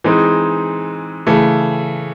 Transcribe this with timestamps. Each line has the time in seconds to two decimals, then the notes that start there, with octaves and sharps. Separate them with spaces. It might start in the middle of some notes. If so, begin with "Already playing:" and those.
0.04 E3 G#3 C4 D#4
1.27 C#3 E3 A3